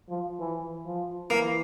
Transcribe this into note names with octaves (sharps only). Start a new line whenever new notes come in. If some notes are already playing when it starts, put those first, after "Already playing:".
F3
E3
F3
E3 A#3